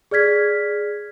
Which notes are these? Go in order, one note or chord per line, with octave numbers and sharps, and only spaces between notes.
G#4 D5 F6 G#6 B6